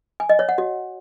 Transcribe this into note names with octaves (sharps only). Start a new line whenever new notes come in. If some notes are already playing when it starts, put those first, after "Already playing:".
G#5
D#5
C#5
F#5
F#4